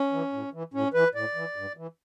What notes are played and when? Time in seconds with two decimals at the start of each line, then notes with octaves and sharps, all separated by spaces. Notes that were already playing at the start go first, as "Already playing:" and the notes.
Already playing: C#4
0.13 E3
0.33 A2
0.53 E3
0.74 A2 C#4
0.94 E3 B4
1.15 A2 D5
1.35 E3
1.56 G2
1.77 E3